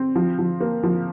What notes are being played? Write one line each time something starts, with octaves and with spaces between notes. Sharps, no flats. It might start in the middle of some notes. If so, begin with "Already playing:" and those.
Already playing: C4
F3
F3
A#3
F3